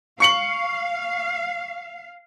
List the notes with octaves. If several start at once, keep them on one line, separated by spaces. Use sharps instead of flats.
F5 C#6 C#7 F#7